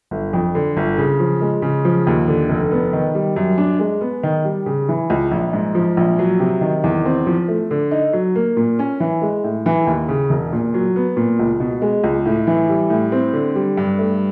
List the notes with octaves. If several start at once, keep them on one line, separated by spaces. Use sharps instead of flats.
G1
F2
D3
G1
C#3
F3
G#3
C#3
F3
D#2
D3
F1
B3
D#3
G3
F#2
D4
G#3
B3
D#3
G3
C#3
E3
C#2
A#1
G#2
F3
A#1
F#3
C3
D#3
E2
C4
F3
A3
D3
D#4
F#3
A#3
A#2
C#4
E3
G#3
A2
E3
D#2
C#3
E1
A#2
F#3
B3
A#2
C#2
B2
G#3
C#2
A2
E3
G3
A2
C4
D3
G3
G2
A3